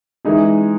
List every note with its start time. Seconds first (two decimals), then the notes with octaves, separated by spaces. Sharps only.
0.25 E3 G#3 D#4 G#4